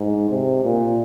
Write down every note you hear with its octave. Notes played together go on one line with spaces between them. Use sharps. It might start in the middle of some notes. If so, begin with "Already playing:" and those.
Already playing: G#2
C3
A#2